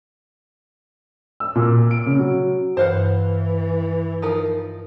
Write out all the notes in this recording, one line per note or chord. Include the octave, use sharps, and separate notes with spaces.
E6
A#2
D7
C#3
F#3
G2 E3 C5 F5 F#5
F3 D#4 A#4